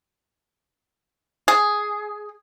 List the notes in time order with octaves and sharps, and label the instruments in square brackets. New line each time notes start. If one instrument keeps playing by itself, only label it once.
[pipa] G#4